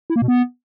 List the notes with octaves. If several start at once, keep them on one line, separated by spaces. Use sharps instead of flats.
E4
A#3
B2
B3